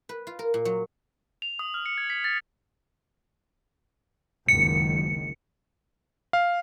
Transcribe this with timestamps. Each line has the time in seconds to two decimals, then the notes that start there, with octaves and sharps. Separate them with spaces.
0.09 B4
0.27 F4
0.39 A#4
0.54 A#2
0.65 F#3
1.42 F7
1.59 D#6
1.74 F6
1.86 C#7
1.98 G#6
2.10 B6
2.24 A6
4.48 F#1 C#2 D#3 C#7
6.33 F5